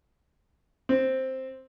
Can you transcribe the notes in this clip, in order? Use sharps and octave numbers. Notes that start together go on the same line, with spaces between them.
C4